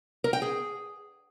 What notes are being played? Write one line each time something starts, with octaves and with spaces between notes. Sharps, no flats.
A#4
G5
G#4